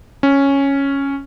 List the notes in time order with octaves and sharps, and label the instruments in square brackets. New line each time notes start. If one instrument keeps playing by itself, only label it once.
[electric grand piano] C#4